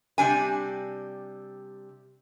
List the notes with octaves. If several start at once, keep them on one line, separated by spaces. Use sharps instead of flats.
C3 G3 D4 G#5